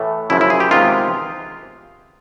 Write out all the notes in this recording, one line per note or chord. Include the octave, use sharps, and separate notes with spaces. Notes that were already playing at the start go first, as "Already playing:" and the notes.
Already playing: A2 E3 A3
F#2 C#3 F3 E4
E4
G#4
G4
C3 D#3 G#3 B3 F4